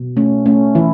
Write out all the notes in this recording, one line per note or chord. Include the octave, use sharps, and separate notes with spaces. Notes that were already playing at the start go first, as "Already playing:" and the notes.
Already playing: B2
A3 C#4
A3 C#4
E3 E4